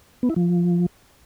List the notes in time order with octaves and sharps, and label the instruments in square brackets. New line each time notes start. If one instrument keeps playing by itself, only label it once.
[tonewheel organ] B3
E4
F3